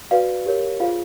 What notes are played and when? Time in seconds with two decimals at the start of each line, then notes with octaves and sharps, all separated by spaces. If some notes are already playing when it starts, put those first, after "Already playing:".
0.11 F#4 B4 D5 F5
0.46 G4 A#4 C#5
0.80 F4 G#4 C5 F5